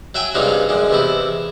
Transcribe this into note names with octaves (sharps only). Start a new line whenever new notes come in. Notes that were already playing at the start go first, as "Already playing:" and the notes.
F#3 E5 G5 G#5
G2 C3 F#3 G#3 D#4 F4
F#2 D3 G#3
E2 C3 A3 E4